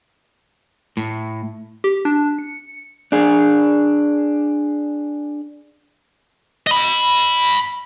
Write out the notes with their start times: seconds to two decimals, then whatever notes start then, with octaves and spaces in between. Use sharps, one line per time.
0.97 A2
1.84 G4
2.05 D4
2.39 C#7
3.12 D4 G#4
6.67 D#5 B5